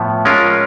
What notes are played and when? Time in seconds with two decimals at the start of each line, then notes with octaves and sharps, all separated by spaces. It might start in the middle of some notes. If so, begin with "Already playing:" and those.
Already playing: A2 F3 B3
0.25 G#3 C#4 F4 A#4